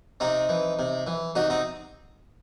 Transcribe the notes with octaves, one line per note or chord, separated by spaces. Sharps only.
C3 C4 D#4
E3
C3
E3
C3 D#4 F#4
C4 D#4